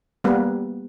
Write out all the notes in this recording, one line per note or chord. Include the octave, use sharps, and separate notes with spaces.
G3 A#3 B3